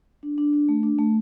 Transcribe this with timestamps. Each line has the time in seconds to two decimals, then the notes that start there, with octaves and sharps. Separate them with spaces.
0.23 D4
0.38 D4
0.53 D4
0.69 A3
0.83 D4
0.98 A3